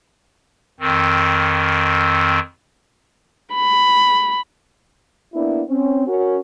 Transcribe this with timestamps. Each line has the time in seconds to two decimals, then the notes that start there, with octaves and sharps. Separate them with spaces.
0.80 F2 D#3 C4
3.55 B5
5.34 A#3 B3 D4 E4
5.69 C4 C#4
6.07 C#4 F#4 A#4